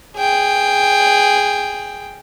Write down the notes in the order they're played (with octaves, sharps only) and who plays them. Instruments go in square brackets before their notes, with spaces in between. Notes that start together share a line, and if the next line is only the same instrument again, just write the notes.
[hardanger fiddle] G#4 G5